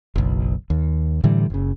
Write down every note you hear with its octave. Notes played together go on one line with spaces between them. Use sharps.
F#1 B1
D#2
A2 D3 E3 G3
F#1 C#3